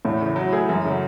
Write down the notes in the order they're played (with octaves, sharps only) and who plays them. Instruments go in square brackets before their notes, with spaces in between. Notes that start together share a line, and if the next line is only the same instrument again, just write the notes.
[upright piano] E2 [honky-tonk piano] A2
[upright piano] C#3 E3 A3
F#3
A3 E4 G#4
[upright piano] F#2 [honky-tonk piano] E3 G#3
[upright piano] C#3 F#3 A3